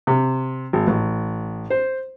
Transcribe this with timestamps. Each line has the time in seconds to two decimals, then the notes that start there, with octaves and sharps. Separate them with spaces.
0.07 C3
0.73 G#1
0.87 A1
1.70 C5